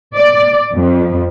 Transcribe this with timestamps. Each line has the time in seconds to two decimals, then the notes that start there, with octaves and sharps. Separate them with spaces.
0.15 D5
0.76 F2